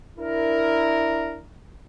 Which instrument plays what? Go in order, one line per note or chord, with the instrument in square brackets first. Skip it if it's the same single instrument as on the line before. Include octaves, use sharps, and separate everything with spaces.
[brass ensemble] D4 E4 A#4